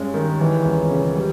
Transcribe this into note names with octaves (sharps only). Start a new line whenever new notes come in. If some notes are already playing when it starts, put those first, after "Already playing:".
Already playing: G2 G#3 C#4
D#3
E3
C#2
C#3
G3